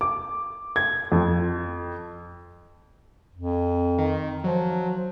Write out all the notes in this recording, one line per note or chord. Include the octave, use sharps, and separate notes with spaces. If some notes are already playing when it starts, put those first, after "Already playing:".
D6
G#6
F2
F2
D#3
F3 F#3